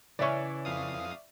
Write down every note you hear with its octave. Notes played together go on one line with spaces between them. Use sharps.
C#3 E3 C#4 D5 E5 C#6
F2 F5 D#6